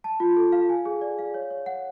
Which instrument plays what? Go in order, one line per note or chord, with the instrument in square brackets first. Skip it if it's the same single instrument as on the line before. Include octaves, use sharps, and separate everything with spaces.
[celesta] A5
F4
A4
F5
G#5
G#4
D5
F5
C#5
C#5
F#5